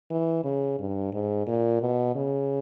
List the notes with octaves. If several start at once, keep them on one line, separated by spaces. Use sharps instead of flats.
E3
C#3
G2
G#2
A#2
B2
C#3